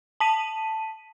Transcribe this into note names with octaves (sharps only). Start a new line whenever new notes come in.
A5 B6 D#7